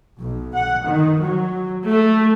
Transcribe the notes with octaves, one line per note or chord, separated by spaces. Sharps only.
B1
F#5
D#3
F#3
A3